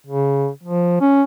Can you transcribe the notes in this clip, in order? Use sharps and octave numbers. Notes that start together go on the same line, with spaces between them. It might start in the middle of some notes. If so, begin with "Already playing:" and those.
C#3
F3
C#4